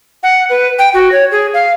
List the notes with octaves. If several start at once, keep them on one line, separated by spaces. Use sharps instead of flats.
F#5
B4
G5
F#4
C#5
G#4
F5